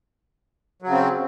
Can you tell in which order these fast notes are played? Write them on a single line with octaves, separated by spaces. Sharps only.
F#3 C#3 C4